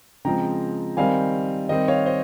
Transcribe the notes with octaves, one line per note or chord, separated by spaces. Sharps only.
C#3 F3 G#3 C4 G5 A#5
D#3 G3 C4 D#4 F5 G#5
D#3 G3 C4 D#5 G5
C#5 F5
C5 D#5